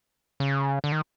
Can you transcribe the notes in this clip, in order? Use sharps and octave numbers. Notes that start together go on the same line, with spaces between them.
C#3
D3
D#3